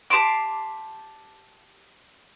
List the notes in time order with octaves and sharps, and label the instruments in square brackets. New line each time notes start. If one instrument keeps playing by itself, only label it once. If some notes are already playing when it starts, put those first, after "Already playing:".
[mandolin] G4 A5 C6 D6